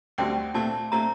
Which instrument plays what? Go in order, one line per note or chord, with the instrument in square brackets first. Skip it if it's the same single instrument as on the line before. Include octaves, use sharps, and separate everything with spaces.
[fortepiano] D2 D3 G3 C4 F#4 [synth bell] G5
[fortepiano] A#2 A3 C4 [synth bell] A5
[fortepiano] A#2 A3 C4 [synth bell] A#5